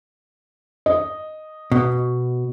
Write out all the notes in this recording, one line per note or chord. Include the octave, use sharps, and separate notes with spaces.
D#5
B2